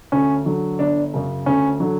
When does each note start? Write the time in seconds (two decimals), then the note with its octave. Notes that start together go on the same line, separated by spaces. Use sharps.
0.12 D2 C#4
0.46 D3 F#3
0.79 G1 D4
1.14 F#2 C#3
1.46 D2 C#4
1.80 D3 F#3